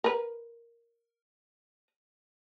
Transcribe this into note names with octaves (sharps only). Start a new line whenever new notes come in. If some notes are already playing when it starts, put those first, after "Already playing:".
A#4 B4